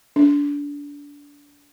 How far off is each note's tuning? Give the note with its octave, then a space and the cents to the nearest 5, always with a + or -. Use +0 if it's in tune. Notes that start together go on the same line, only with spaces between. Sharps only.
D4 -25